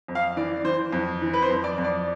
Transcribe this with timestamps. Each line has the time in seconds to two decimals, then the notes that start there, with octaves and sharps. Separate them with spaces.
0.08 F2
0.15 F5
0.37 E3 D5
0.64 E3 C5
0.92 F2
1.22 E3
1.33 B4
1.42 C5
1.50 F2
1.64 D5
1.78 F2
1.84 D5